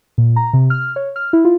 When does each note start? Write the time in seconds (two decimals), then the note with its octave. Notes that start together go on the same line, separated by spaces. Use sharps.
0.18 A#2
0.36 A#5
0.53 C3
0.70 F6
0.96 C#5
1.16 F6
1.33 E4
1.45 F4